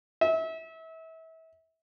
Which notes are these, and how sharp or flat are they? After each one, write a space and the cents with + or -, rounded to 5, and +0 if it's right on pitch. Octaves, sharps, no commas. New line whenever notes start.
E5 -30